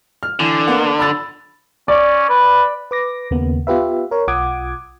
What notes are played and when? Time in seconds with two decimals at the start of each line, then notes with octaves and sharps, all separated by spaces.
0.23 F6
0.40 D3 E3
0.67 A#3 B3 F#5
0.99 B5 E6 A6
1.88 C#4 D5
2.29 B4
2.91 B4 D6 A#6
3.31 D#2 C#3 A#3 B3
3.67 B3 F4 G4 B4 E5
4.11 A#4 C#5
4.28 B1 F4 F#5 D6 D#6 G#6